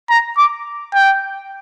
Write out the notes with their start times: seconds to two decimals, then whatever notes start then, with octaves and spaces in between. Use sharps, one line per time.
0.10 A#5
0.37 D6
0.94 G5